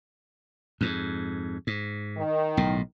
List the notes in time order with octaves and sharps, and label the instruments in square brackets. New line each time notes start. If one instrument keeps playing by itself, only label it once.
[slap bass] F2 G#2
G#2
[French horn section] D#3
[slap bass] B1 A2